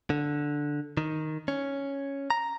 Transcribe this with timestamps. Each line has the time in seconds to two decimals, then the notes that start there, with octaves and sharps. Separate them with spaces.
0.10 D3
0.97 D#3
1.48 C#4
2.30 A#5